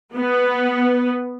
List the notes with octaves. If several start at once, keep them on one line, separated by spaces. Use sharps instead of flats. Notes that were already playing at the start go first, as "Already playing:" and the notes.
B3